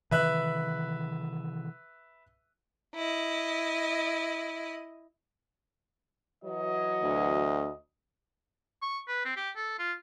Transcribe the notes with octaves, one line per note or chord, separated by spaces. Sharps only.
C3 D#3 E3 B4 E5 F#6
E4 D#5
E3 F#3 D#5
D2
C#6
B4
C4
G4
A4
F4